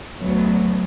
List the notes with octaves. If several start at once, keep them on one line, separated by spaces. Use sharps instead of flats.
D2 F#3 B3